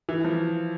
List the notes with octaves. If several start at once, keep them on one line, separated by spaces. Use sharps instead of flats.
E3
F3